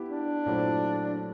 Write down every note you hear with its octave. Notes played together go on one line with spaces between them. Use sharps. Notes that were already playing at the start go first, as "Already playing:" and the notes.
Already playing: B3 E4 G4
D4
A#2 F#3 A3 C4 E4